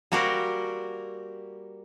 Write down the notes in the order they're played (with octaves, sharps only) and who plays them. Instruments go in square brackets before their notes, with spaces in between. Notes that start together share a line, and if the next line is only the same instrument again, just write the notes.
[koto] G3 A#3 F#4 G4 A#4 C5